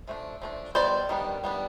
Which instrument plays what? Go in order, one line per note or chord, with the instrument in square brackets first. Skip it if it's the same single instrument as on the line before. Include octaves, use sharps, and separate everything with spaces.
[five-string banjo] F3 A3 D4
F3 A3 D4
D#3 G3 B3 C5 D5
D#3 G3 B3 D4
G3 B3 D4